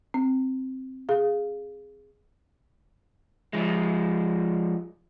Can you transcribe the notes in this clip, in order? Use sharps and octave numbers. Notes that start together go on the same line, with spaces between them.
C4
G#4 F5
F3 G#3